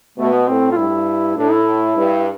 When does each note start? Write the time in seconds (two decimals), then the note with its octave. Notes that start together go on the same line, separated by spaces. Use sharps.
0.17 B2 A3
0.33 B3
0.48 A2 C4
0.72 F4
0.77 G2 E4
1.37 A2 D4
1.52 E4
1.96 G2